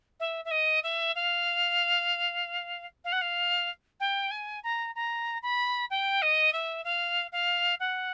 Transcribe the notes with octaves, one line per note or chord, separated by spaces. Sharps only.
E5
E5
D#5
E5
F5
F5
F#5
F5
G5
G#5
A#5
A#5
B5
G5
D#5
E5
F5
F5
F#5